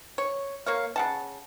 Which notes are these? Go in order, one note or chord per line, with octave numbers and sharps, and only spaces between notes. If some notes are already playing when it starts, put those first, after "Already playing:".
C#5
A#3 C#5 F5
C#3 F#5 A5